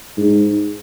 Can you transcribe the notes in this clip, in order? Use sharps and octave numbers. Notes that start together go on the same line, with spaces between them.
G#2